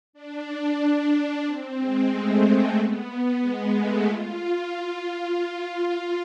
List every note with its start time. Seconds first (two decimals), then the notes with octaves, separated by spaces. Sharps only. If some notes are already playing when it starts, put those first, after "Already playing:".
0.13 D4
1.44 C4
1.78 G#3
2.10 A3
2.76 B3
3.40 G#3
3.73 A3
4.06 F4